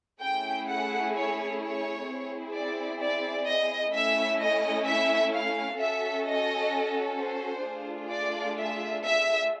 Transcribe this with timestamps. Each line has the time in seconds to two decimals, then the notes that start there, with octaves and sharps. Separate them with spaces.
0.21 A3 C#4 E4 G#4 G5
0.67 F#5
1.15 C#5
1.61 C#5
2.07 C4 E4 G#4
2.54 D5
3.00 D5
3.46 D#5
3.93 A3 C#4 E4 E5
4.39 D#5
4.86 E5
5.32 F5
5.78 C#4 F#4 A4 E5
6.25 D#5
7.18 C5
7.64 A3 D4 F4 G#4
8.10 D5
8.56 E5
9.04 E5